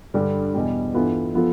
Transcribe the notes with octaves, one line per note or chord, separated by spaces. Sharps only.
G2 D3 G3
E2 B2 G3
G2 E3 B3 F4 A4
F3 B3 F4 A4